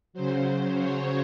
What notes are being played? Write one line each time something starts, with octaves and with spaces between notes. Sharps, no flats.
C#3 F#3 C5
C#5